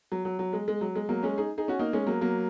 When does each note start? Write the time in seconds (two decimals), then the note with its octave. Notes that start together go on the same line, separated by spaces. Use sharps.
0.12 F#3
0.25 F#3
0.39 F#3
0.53 G#3
0.68 G#3
0.81 F#3
0.96 G#3
1.09 F#3 A#3
1.23 G#3 C#4
1.38 D#4 G#4
1.58 D#4 G#4
1.68 C#4 F#4
1.79 A#3 D#4
1.93 G#3 C#4
2.07 F#3 A#3
2.21 F#3 A#3